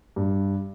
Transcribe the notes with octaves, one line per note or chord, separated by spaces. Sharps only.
G2